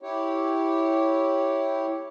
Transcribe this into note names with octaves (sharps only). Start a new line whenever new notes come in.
E4 G4 C#5